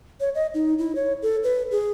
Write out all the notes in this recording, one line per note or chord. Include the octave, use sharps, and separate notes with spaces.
C#5
D#5
D#4
E4
C#5
A4
B4
G#4